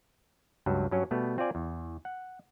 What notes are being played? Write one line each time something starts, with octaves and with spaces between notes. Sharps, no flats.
C#2 G2 F#3
G2 F#3 C#4
B2 G3 A3 B3
C4 F4 C5 D5 G#5
E2
F#5